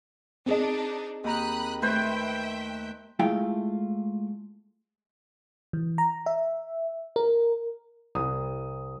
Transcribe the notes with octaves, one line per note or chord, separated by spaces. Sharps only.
C4 D4 D#4 G#4 D#5
D#2 G5 A#5 B5 D#6 F#6
A3 B4 C5 E5 G5 B6
G#3 A3 E4 F4 F5 G5
E3
A#5
E5
A#4
C2 D#6